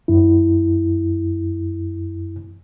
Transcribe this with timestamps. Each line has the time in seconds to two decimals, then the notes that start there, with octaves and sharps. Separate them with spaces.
0.08 F#2 E4